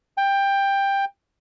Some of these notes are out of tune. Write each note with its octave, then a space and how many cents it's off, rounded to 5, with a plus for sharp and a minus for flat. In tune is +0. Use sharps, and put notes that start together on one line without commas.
G5 +15